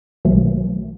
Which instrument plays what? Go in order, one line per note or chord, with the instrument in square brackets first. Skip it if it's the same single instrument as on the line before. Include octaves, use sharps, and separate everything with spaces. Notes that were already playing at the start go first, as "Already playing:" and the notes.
[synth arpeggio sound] B1 B2 D#3 E3 F#3 A3